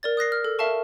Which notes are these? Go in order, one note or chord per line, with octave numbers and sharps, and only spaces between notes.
A#4 D5 A6
D#6 F#6 A#6 C7
F6
A4
A#4 E5 F5 A5 C#6